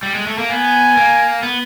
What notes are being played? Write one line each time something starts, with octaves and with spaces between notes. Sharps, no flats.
G3
G#3
A3
A#3
B3 G#5
A#3
B3